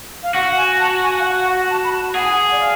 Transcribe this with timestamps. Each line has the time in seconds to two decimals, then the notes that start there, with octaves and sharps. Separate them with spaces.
0.23 F5
0.35 F#4 F#5
0.57 G#5
0.80 A5
1.02 G#5
1.20 F5
1.25 F#5
1.48 F#5
1.70 A5
1.84 B5
1.92 A5
2.15 G#4 F#5
2.23 G#5
2.32 F#5
2.52 D5
2.61 F5